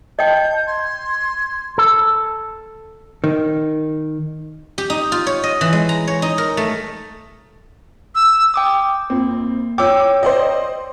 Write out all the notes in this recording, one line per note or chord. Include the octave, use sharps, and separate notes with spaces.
D#5 G5 A5 G6
C6 G#6
A4
D#3
G4
D#4
F4
C#5
D#5
E3
G#3
A#5
C#5
D#4
A#4
A3
E6
G5 D6 D#6
F2 A#3 C4
C#5 G5 D6 E6
C5 D5 D#5